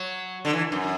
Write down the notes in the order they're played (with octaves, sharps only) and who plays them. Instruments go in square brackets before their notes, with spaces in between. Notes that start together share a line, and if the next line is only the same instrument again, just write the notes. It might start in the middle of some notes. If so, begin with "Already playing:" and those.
Already playing: [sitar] F#3
D3
E3
F#2